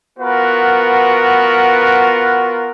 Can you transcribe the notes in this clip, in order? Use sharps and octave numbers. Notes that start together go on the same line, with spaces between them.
B3 F4 F#4 A#4 B4